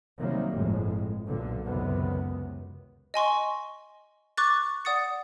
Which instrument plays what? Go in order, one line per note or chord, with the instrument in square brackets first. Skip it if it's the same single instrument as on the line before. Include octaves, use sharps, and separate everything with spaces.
[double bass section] C3 D#3 F#3 G3 A#3
G1 F2 A2 G#3
B1 A#2 D3
C#2 F#2 C3 D#3 B3
[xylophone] D#5 G#5 C6 C#6
C#6 D6 F#6 A6
D5 F#5 D#6 A6 C#7